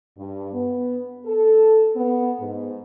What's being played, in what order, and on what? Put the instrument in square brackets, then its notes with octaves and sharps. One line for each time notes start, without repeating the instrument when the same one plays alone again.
[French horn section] G2
B3
A4
B3
G#2